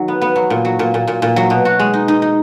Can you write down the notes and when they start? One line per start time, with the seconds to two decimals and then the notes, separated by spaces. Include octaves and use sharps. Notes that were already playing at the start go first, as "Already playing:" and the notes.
Already playing: D#3 F#3
0.08 B3
0.21 B3
0.36 F#3
0.50 A#2
0.65 F#3
0.79 A#2
0.94 A#2
1.07 A#2
1.22 A#2
1.36 F#3
1.50 B2
1.65 F#4
1.79 G#3
1.94 D#4
2.08 D#4
2.22 D#4